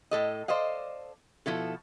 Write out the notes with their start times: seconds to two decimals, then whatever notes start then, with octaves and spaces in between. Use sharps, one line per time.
0.11 A2 A4 D#5
0.48 A4 C5 D5 D#5 F5
1.46 B2 F3 E4 A4